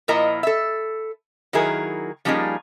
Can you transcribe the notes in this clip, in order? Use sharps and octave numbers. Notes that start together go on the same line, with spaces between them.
A#2 F3 E4 A#4 D#5 A#5
A4 E5
D#3 F#3 E4 G#4 A#4
F3 G3 A#3 C#4 D#4 G#4